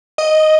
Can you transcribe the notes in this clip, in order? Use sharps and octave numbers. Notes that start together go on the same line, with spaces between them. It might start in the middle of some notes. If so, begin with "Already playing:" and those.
D#5